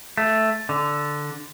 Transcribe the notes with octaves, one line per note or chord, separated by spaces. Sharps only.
A3
D3